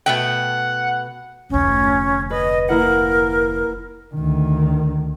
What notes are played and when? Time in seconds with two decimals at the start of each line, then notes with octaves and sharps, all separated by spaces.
0.06 B2 A3 F#5 G5
1.50 F1 D2 C#4
2.30 B4 D#5
2.69 A#3 E4 A#4 F#5
4.15 D2 D#3